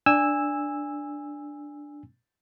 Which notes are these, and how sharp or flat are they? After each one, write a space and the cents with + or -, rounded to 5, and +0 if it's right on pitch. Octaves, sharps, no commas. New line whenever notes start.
D4 +0 G#5 -20 E6 +0